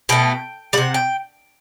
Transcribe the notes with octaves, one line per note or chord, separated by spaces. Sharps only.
B2 A3 G5
C3 G3 F#5
G5